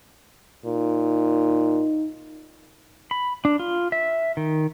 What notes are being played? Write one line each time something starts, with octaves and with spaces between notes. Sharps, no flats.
A#2 D#4
B5
D4
F4
E5
D#3